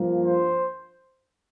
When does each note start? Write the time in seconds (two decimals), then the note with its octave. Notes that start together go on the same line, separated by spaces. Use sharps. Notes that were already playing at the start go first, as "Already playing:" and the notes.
Already playing: G2 F3 A#3
0.25 C5